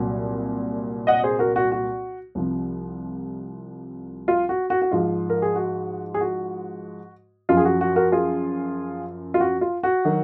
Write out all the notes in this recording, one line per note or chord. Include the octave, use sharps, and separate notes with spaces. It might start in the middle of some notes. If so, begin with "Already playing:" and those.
Already playing: C2 A#2 F#3
D#5 F#5
G#4 C5
F#4 A#4
F#4
F#4
C2 C3 F3
F4
F#4
F#4
F#4
G#2 F3 F4
A#4
G#4
F#4
G#4
F#4
F#2 F3 F4
G#4
F#4
F#4
F#4 A#4
F4 G#4
F4
F#4
F4
F#4
D#3 F#3